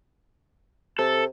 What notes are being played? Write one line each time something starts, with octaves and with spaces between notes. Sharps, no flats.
C3 A4